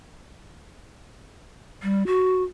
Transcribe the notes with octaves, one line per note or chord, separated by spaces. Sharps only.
G3
F#4